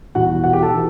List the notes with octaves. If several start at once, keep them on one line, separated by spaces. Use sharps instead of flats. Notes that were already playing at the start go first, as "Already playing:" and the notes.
E2 B2 G3 F#4 F#5
F#4 F#5
G4 G5
A4 A5
E3